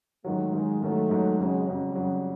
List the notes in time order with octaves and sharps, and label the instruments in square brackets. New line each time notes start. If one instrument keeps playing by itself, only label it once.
[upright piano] G#2 D#3 F#3 [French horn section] A3
[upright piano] G#2 D#3 F#3 [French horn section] G#3
[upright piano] G#2 D#3 F#3 [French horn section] A3
[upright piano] G#2 D#3 F#3
[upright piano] F2 C#3 F#3 [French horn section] G#3
[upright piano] F2 C#3 F#3 [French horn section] G3
[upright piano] F2 C#3 F#3